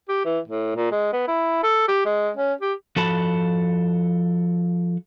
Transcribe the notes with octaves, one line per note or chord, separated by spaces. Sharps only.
G4
E3
A2
A#2
G#3
B3
E4
A4
G4
G#3
C#4
G4
F3 F#4 A4 A5 B5